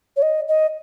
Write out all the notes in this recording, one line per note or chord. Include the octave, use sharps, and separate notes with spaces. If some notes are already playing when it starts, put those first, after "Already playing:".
C#5
D#5
D#5